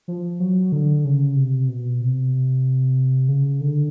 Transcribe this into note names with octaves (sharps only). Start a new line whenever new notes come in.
F3
F#3
D3
C#3
C3
B2
C3
C#3
D3